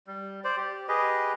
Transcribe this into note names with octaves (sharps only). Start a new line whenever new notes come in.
G3
C5 D5
G4
G4 G#4 B4 D#5